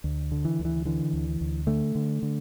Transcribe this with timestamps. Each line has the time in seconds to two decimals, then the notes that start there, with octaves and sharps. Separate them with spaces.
0.04 D2
0.32 D3
0.45 E3
0.59 D2
0.65 E3
0.85 D3 E3
1.13 D2
1.41 D2
1.67 D3 A3
1.95 D3
2.22 D3